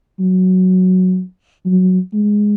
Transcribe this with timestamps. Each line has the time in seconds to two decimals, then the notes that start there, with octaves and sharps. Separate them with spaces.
0.20 F#3
1.65 F#3
2.14 G#3